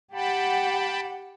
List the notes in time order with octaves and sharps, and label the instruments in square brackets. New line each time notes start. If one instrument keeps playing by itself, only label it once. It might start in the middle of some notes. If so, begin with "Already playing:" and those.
[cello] G4 F#5 [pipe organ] G5 A5 B5